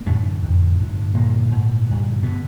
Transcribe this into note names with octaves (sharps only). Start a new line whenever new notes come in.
A#3
F#2 A2 D3 A3
F2 D3
G2 D3
G2 A#2 D3 A#3
G#2
G2 D3
B2 D3 B3